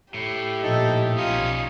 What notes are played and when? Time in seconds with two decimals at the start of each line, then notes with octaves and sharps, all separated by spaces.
0.14 A2 G4
0.63 A#2 F3 D#4 A4
1.17 B1 C#4 D#4 F4 D#6